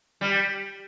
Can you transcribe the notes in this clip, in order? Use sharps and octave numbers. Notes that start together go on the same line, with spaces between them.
G3